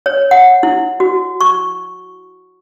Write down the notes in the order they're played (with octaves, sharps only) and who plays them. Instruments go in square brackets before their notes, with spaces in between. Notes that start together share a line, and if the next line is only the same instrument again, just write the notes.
[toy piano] C#5
F#5
E4
F#4
C#6